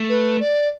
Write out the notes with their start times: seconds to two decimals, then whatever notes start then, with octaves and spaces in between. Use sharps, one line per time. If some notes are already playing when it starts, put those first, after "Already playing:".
Already playing: A3
0.09 B4
0.40 D5